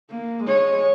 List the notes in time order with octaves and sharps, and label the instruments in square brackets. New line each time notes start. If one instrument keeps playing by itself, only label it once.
[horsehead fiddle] A#3
G#3 C#5